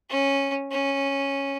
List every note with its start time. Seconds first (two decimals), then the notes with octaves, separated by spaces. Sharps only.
0.10 C#4
0.71 C#4